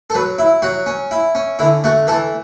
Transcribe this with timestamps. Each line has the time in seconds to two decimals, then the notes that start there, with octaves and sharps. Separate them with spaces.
0.10 A4
0.14 F#3 B4
0.38 E4
0.62 F#3 F#4
0.86 C#4
1.11 E4
1.35 C#4
1.59 D3 E4
1.84 A3 F#4
2.07 E3 A4